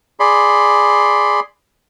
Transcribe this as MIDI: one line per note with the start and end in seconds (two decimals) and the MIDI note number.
0.20 1.40 68
0.20 1.40 74
0.20 1.40 83
0.20 1.40 84